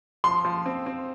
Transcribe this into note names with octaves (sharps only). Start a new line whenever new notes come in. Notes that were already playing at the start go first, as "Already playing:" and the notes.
F3 C6
F3
C4
C4